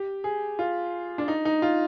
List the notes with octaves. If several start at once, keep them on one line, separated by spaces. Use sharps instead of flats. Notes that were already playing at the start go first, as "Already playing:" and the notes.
Already playing: G4
G#4
F4
D4
D#4
D#4
F4